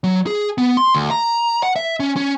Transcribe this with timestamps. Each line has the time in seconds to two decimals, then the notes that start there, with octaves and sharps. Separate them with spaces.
0.04 F#3
0.27 G#4
0.58 B3
0.77 C6
0.95 D2
1.11 A#5
1.63 F#5
1.76 E5
2.00 C#4
2.16 C#4